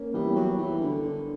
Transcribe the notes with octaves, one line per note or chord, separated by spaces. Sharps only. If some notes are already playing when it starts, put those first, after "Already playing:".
Already playing: A#3 C#4
E3 G3 B3
F#3
E3
D3
D3